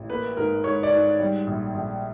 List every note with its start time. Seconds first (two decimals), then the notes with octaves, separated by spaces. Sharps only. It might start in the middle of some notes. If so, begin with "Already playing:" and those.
Already playing: A1
0.10 A#3 B4
0.37 G#2 A#4
0.64 G#2 C#5
0.83 D5
0.92 G#2
1.20 G3
1.47 A#1
1.74 A#1